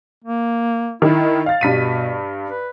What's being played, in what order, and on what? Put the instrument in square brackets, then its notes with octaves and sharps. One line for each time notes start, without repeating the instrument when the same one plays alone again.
[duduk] A#3
[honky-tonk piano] D#3 [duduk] E4
[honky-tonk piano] F5 A6
[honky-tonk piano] G2 B6 D#7 [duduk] B2
[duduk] B4